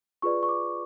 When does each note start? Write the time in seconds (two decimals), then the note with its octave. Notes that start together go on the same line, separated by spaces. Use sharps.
0.22 F4 G#4 B4 D5 C#6
0.43 C#6
0.49 D6